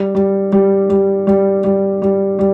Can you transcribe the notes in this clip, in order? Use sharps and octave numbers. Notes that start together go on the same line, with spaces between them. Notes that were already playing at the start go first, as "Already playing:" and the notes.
Already playing: G3
G3
G3
G3
G3
G3
G3
G3